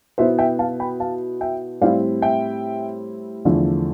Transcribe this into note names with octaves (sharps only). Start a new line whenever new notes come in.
B2 B3 E4 C5 E5
E5 G5
F5 A5
G5 B5
F5 A5
E5 G5
A2 G3 C4 E4 D5 F5
E5 G5
E2 D3 F3 A3 E4